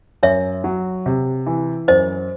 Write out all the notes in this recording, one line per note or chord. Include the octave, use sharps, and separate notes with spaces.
F#2 C#5 E5
F#3
C3
E3
F#2 C5 D#5